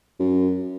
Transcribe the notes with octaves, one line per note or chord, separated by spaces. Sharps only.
F#2